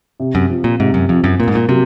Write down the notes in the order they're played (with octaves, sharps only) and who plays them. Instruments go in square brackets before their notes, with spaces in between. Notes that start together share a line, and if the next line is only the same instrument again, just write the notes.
[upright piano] C3
[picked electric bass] F#2
[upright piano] F3
[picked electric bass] A#2
[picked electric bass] G#2 [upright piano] C3
[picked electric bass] F#2
[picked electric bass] F2 [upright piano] F3
[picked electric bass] F#2
[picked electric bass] A#2 [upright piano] A#3
[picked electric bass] G#2
A#2
[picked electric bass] C3 [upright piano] F#3